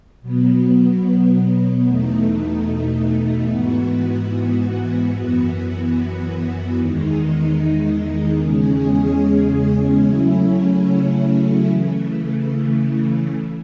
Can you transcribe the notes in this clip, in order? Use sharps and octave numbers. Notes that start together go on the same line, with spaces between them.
B2 F#3 B3
E2 B2 A3 D#4
G#2 E3 B3 F#4
F#2 E3 B3 F#4
E2 D#3 G#3 D#4
E2 C#3 G#3 C#4 G#4
C#3 F#3 A3 C#4 E4
C#3 E3 A3